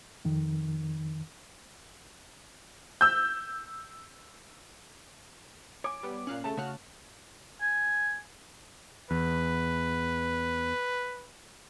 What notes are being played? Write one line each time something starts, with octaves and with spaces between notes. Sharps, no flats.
F2 D#3
E6 G6
C#5 G#5 D6
G3 B3
A#2 C#4 F5 F#6
C#3 A3 A5
C#3 A3 F#4 C#5 F6 F#6
G#5
E2 B4